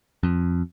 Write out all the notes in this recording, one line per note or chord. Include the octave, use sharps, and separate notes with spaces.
F2